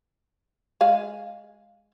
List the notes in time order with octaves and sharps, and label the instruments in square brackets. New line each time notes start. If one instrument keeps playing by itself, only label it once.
[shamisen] G#3 F5